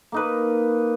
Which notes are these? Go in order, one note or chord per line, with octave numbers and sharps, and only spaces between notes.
A#3 D#4 B4